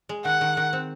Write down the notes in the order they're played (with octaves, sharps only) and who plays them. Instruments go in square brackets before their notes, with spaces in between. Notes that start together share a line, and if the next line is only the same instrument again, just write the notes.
[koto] G#3
[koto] D#3 [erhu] F#5
[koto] D#3
D#3
C4